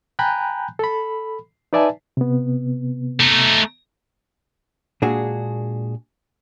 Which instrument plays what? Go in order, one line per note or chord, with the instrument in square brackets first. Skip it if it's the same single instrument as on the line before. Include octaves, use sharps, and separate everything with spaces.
[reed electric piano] G5 G#5 A#5 B5 F#6 G6
A4 B5
D#4 B4 D5 E5 G#5 A5
C3 B3
[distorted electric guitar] A3 D#4
[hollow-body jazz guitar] A#2 G#3 D4 F#4 G#4